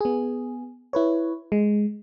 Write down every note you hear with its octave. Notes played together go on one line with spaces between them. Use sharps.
B3 G#4
E4 B4 C#5
G#3